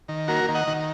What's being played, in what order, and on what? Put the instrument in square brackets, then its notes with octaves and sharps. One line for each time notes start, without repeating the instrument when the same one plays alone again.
[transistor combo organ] D#3
A#3 F#4 A#4
D#3
D#5 F#5
D#3